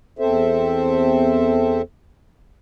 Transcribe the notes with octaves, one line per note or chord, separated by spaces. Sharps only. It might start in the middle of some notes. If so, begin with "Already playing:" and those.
E2 C4 A4 C5 E5